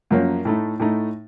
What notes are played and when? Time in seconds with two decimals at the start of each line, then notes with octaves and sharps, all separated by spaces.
0.11 F#2 F3 A#3 C#4
0.45 A2 A3 D#4
0.80 A2 A3 D#4